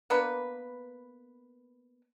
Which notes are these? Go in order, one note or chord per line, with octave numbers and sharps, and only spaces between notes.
A#3 B3 D4 B4